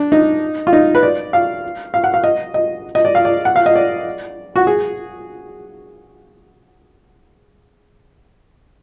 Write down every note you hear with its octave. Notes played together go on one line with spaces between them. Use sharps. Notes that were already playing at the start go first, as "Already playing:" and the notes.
Already playing: D4
D#4
F4
D#4
B4
D5
F5
F5
F#5
F5
D#5
D#5
D#5
D5
F5
D5
F#5
F5
D#5
D5
F#4
G#4